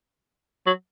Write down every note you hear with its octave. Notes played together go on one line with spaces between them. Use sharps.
F#3